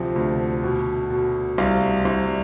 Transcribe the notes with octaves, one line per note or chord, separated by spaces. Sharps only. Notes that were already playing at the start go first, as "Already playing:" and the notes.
Already playing: D2 C3 F3
D2
B2
B2
C2 F5
C2